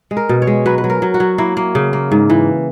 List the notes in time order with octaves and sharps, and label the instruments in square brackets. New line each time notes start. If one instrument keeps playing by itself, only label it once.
[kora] G#3
A#4
B2
C#5
G#3
F#3 B4
B4
F#3
A#4
F#3
F#4
F#3
A#3 E4
A#3
C#3
A#3
G#2
E3